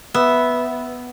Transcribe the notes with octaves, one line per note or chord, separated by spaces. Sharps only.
B3 E5